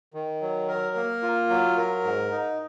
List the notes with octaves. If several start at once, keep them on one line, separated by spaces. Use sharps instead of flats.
D#3
F#3
A#4
A#3
F4
F#3
A#4
G#2
D#4